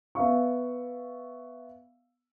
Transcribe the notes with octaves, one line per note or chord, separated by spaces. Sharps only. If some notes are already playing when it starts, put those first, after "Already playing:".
B3 E5 F5 C#6